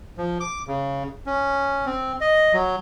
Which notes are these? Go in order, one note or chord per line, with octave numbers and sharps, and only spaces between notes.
F3
D6
C#3
C#4
C4
D#5
F#3